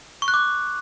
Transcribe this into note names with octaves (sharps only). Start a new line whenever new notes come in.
C#6
F#6
D6